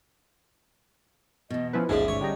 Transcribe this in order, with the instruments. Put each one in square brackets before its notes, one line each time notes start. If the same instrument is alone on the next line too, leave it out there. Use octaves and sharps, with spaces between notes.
[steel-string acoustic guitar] E2 B2 [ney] D#5
[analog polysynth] F3 E4 B4 [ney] C#4
[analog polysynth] A1 D#2 G#2 [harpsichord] F3 G#3 [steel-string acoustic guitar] C#4 D5 [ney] E5
[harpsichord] C#5
[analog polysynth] D3 G3 D#4 [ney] G5